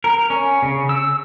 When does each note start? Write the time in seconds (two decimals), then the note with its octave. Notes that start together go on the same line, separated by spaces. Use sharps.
0.04 A#4
0.30 C#4
0.63 C#3
0.89 E6